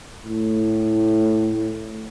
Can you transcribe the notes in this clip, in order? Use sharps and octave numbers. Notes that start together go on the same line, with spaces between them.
A2